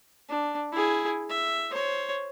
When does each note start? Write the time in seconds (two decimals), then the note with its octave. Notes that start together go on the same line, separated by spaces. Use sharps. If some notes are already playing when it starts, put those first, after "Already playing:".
0.29 D4
0.72 E4 G#4
1.29 E5
1.71 C5 C#5